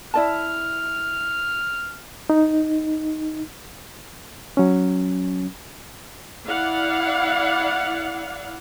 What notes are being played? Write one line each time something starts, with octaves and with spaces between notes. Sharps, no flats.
E4 D5 A5 F6
D#4
F#3 C#4
E4 D5 F5 F#5